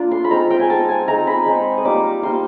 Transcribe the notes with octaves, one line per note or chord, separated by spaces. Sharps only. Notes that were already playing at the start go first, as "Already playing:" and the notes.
Already playing: A#3 D4 F4
C6
B5
G#3 C4 D#4 A#5
G5
G#5
G#3 C4 D#4 A5
G#5
G#3 C4 D#4 A#5
B5
G#3 C4 D#4
D#6
G3 A#3 D#4 D6
G3 A#3 D#4 C6